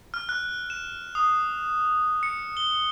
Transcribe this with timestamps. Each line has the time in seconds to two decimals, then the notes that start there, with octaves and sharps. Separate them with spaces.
0.14 F6
0.29 F#6
0.70 E7
1.15 D#6
2.23 C#7
2.57 G7